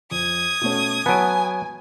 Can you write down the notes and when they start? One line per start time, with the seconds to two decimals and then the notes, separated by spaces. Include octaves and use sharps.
0.11 F2 D#6 G#6
0.61 B2 A3 C#4
1.06 F#3 B3 G#5 A5 D7